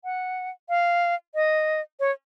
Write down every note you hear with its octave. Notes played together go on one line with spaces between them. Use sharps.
F#5
F5
D#5
C#5